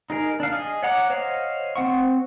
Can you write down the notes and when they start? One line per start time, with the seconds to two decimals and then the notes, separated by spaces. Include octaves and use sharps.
0.10 D#4 G#4 A#4
0.40 D4 F5
0.53 G#4 D#5
0.83 C#5 F#5 A#5 D6
1.10 C5 C#5 D#5 F5 F#5
1.76 C4 F#5 C#6